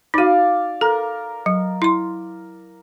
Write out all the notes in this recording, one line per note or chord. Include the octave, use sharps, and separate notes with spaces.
D#4 F#4 D5 F5
A4 A#4
F#3
E4 C6